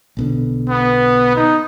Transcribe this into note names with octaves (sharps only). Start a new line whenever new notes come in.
B1 B2 D3
B3
D#4